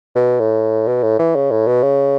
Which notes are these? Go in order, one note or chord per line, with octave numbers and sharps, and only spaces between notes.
B2
A2
B2
A2
E3
C#3
A2
B2
C#3